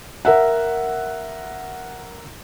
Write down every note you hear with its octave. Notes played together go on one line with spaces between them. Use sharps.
A#4 E5 F#5